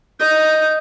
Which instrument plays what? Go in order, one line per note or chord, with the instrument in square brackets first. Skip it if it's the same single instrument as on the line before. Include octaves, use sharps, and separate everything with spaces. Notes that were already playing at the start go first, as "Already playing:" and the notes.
[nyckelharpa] D#5 [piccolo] G6